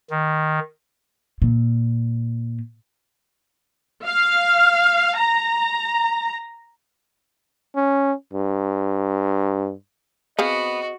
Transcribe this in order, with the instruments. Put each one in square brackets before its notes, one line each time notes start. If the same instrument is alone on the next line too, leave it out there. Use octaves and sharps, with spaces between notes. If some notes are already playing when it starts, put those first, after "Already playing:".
[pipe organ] D#3
[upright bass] A#2
[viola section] F5
A#5
[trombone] C#4
G2
[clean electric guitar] B3 [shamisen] C4 G#4 F5 [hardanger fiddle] F#4 [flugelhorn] D#5